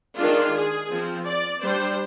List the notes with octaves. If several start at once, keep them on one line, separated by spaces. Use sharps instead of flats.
D#3 G#3 D4 F4
G#4
F3 C4
D5
G3 D4 C5